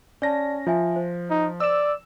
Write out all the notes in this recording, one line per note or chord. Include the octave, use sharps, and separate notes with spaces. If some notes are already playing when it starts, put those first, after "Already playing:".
C#4 D5 A5 A#6
F3 F4 E5 G#5
C5
D#4
D5 E6 E7